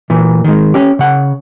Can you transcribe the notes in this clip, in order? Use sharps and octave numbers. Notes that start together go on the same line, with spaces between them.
A#2 E3
D#3 G#3
C#4 G4
C#3 F#5